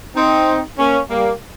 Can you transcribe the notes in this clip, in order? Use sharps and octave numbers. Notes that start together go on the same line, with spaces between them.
C4 D#4
A#3 C#4
G3 A#3